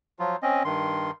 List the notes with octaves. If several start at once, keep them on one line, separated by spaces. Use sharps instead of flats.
F3 F#3 F4
C4 C#4 D#5
G2 D#3 C6